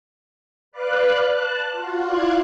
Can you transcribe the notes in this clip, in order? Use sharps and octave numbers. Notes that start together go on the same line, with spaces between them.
B4 D5 F5 F#6
A5 F#6
F4 F#4
E4 F4 D5 F5 F#6 G#6